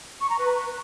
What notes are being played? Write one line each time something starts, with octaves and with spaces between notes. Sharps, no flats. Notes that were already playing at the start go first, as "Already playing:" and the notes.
C#6
A#5
B4